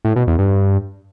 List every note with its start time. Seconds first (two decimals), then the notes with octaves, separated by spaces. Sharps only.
0.05 A2
0.16 B2
0.27 E2
0.39 G2